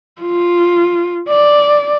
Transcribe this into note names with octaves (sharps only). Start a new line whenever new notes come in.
F4
D5